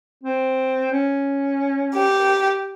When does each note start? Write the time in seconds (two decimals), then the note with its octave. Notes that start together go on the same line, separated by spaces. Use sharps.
0.24 C4
0.92 C#4
1.94 G4